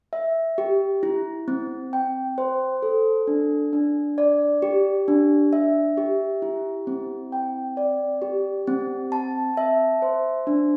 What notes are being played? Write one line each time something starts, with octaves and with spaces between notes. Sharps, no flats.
E5
G4
E4
C4
G5
C5
A4
D4
D4
D5
G4
D4
E5
G4
E4
C4
G5
D5
G4
C4
A5
E5
C5
D4